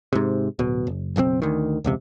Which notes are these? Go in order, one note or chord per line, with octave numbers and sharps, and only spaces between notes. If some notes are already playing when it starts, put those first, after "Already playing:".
G#2 C3
D1 B2
F#1
F#1 B1 C#3 C4
D2 D#3
E1 C#2 C3